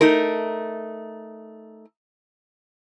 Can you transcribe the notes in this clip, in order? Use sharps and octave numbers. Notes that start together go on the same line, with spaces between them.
A3 D#4 A#4